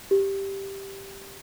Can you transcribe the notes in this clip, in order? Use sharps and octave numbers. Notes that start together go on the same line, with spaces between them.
G4